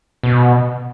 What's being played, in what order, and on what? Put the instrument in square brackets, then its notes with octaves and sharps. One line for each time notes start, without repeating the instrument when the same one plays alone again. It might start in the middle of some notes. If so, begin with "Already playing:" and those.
[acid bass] B2